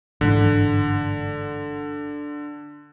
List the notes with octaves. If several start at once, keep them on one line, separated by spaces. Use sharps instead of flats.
G1 G#2 D3 E3